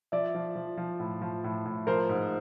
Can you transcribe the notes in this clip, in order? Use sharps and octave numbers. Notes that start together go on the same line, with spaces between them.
F3 D5 E5
F3
F3
F3
A2
F3
A2
A2
F3 A#4 C5
G#2